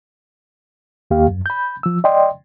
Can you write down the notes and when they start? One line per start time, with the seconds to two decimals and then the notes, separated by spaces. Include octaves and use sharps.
1.11 D#2 A#3 G4 F5
1.28 F#2
1.46 B5 G6
1.83 F3 E6
2.04 D5 D#5 G5 C6